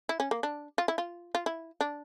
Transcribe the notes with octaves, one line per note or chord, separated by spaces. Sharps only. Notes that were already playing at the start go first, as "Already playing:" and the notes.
E4
C#4
A#3
D4
F4
E4
F4
F4
E4
D4